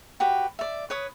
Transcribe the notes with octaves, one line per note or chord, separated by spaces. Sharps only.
F#4 G4 B4
D5 E5
B4 C#5 D#6